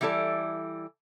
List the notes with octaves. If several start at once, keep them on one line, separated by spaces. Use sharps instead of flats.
E3 G3 E4 A4 D5